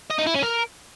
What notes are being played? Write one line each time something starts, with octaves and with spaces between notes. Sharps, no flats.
D#5
D#4
E4
C#4
A#4